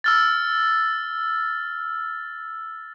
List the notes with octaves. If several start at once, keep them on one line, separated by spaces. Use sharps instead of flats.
E6 F6 A6